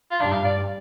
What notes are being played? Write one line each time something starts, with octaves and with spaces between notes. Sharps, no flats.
F4
G2 D4
F5
D5